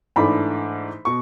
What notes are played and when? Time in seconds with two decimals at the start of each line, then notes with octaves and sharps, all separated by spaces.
0.16 G#2 E3 A3 D4 B5
1.05 B2 C#6